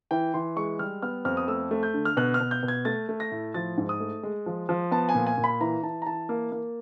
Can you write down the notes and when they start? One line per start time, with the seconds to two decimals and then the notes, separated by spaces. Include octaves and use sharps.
0.11 E3 G5
0.34 E3 C6
0.56 G#3 C#6
0.79 G3 F6
1.02 B3 F6
1.25 F2 F6
1.37 D#6
1.48 A3 E6
1.71 A3
1.83 G6
1.94 D3
2.05 F6
2.17 B2 F#6
2.34 F6
2.40 B2
2.51 G6
2.63 B2
2.68 G#6
2.85 A3 A6
3.09 A3
3.20 A#6
3.31 A2
3.54 F3 A6
3.78 G#2
3.89 D#6
4.00 A3
4.23 G#3
4.46 F3
4.69 F3
4.91 B3 A5
5.09 G#5
5.15 A#2
5.27 G#5
5.38 A#2
5.44 B5
5.61 E3 A#5
5.83 E3 A5
6.02 A#5
6.06 E3 A5
6.29 A#3
6.52 A#3